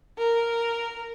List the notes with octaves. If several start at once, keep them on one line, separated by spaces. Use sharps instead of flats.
A#4